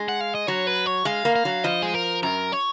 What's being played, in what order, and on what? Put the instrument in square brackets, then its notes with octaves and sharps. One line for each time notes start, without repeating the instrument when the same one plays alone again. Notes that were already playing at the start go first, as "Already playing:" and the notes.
Already playing: [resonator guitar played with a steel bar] G#3
[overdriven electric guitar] F#5
F5
D#5
[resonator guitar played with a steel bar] F#3 [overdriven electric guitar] C#5
[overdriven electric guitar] B4
C#5
[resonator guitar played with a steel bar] G#3 [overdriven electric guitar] F5
[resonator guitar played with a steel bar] A#3
[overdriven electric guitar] F5
[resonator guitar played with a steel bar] F#3
[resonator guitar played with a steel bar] F3 [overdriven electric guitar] D#5
[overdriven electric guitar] G#4
A#4
[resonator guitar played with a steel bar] F#2 [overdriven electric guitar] A#4
[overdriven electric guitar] C#5